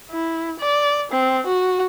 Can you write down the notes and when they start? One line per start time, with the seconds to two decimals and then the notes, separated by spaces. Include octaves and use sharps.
0.11 E4
0.59 D5
1.11 C4
1.46 F#4